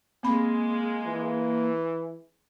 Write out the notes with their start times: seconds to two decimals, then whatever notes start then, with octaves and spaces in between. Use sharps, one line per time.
0.23 G#3 A#3 C4 B5
1.07 E3